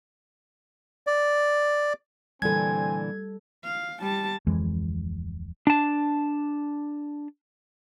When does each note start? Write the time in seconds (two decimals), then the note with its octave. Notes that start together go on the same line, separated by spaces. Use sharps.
1.07 D5
2.42 A#2 D3 E3 G3 C4 A4 G#5 G#6
3.64 F5
4.01 G3 A5
4.47 D1 F2 E3 G#3
5.67 D4 A5